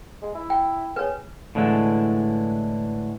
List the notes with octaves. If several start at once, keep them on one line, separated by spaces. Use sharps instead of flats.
G#3
E4
G5
G#4 B4 C#5
A2 D3 E3 G#3